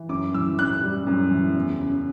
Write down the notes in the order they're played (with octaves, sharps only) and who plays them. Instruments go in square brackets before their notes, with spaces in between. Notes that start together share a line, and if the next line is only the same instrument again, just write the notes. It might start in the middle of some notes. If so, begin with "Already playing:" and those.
Already playing: [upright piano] E3
F#2 D6
E3 E6
F#2 F#6
G3
F#2
E3
E2
C#3